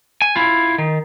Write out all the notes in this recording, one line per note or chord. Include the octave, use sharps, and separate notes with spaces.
G#5
E4 F4
D#3